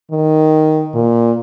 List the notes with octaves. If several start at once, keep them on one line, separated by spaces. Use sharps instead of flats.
D#3
A#2